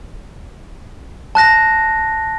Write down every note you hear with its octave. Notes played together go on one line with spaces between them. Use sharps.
A5 F#6 A#6